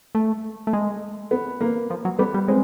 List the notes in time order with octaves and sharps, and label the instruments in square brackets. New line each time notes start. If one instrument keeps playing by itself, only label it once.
[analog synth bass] A3
A3
G#3
[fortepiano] B3
A#3
[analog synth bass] F3
F#3
[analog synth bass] G3 [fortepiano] B3
[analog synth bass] G3
[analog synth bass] G#3 [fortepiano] C4